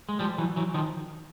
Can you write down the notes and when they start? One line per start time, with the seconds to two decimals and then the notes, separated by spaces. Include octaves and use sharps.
0.09 G#3
0.19 F3 G3
0.38 E3 F#3
0.56 E3 F#3
0.74 D#3 F3